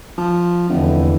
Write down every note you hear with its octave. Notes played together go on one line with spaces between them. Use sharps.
F3
F1 E2 D3 E3